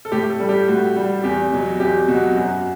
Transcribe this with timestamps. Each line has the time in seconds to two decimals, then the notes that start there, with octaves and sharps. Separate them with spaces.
0.05 A4
0.12 A2 G4
0.30 A4
0.40 G3
0.49 G4
0.68 A2 F#4
0.96 G3
1.24 E2 G4
1.52 B2 F#3
1.80 E2 G4
2.08 B2 F#4
2.12 F#3
2.36 F#2 F#4